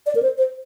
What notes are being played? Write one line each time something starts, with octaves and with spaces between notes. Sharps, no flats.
D5
A#4
C5
C5